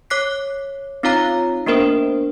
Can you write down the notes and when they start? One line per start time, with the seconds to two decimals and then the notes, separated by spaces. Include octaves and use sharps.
0.10 C#5 D6 F#6 B6 C7
1.03 C4 D#4 F4 C#5 F5 A#5
1.66 A#3 B3 D4 A#4 C5